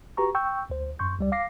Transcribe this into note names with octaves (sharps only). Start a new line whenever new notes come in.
F#4 G4 B4 A#5 C#6
G5 C#6 E6 G6
D2 C5
F#2 C6 C#6 G6
C#2 G3 D5
F5 D6 A#6 C7